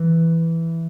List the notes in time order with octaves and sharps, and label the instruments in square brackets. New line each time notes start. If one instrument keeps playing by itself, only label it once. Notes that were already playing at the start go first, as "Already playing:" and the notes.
Already playing: [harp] E3